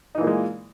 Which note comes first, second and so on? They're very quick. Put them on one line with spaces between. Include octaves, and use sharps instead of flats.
D#4 E3 A#2 A#3 G#3